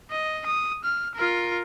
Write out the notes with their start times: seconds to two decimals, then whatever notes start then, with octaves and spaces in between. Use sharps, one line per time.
0.11 D#5
0.46 D#6
0.84 F6
1.15 F4 A#4